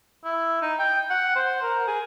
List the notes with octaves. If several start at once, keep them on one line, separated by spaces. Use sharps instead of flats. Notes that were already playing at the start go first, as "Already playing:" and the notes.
E4
D#4
G5
F#5
C5
A#4
G#4